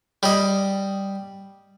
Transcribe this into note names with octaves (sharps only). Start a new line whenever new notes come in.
G3 D#5